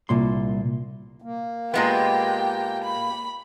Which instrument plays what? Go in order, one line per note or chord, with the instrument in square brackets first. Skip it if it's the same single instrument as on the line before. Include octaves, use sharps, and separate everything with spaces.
[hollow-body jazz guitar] C2 A#2 C6
[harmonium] A#3
[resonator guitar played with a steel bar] A#2 G#3 B3 [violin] G4 G5
[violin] B5